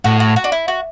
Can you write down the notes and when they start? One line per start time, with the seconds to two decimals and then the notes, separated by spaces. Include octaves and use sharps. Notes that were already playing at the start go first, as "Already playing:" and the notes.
0.04 A2 F#4
0.20 F#4
0.36 F#4
0.44 D4
0.52 E4
0.68 F#4